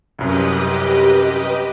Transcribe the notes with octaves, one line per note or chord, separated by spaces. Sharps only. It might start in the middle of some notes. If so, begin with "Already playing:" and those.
C2 F#2 G4 B4 D#5